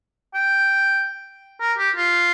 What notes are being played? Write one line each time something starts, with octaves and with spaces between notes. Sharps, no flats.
G5
A#4
G4
F4